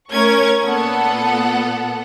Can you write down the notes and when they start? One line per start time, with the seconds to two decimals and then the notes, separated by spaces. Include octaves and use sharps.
0.12 A3 C#4 A#4 C#6 G#6
0.62 A#2 B3 A4 F#5